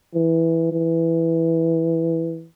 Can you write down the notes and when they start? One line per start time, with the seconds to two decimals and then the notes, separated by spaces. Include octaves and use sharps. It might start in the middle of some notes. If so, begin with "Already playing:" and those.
0.15 E3
0.72 E3